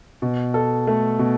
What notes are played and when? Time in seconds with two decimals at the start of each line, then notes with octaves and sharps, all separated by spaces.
0.22 B2
0.54 A4
0.87 A3
1.19 B2